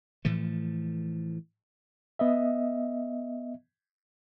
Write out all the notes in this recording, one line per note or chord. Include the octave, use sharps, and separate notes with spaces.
A2 E3 F3 A3
B3 D#5 E5